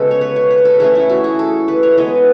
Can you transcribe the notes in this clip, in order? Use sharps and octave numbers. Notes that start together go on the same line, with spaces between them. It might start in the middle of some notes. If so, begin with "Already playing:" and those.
Already playing: C#3 G#3 B3 F#4 A4
C#5
B4
C#5
B4
A4
E3 A3 C#4 G#4
E4
F#4
G#4
A4
B4
C#5
E3 G#3 B3 D#5